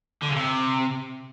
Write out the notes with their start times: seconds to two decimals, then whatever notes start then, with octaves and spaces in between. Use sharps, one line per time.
0.22 D3
0.29 C#3
0.35 C3